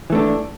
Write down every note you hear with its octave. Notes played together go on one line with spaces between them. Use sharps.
E3 A3 D4